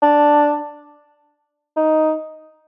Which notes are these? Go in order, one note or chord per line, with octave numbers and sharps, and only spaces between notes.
D4
D#4